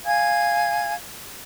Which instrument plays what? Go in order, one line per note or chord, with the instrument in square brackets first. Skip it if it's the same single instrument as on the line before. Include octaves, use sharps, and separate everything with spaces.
[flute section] F5 G#5 G#6